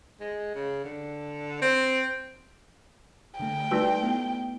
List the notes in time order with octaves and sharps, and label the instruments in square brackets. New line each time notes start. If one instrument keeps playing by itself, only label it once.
[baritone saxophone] G#3
C#3
D3
C4
[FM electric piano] D3 A3 [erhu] G5
[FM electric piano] G3 A3 [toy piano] D#4 F#4 E6 [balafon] B4 D5
[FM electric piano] A3 B3 E4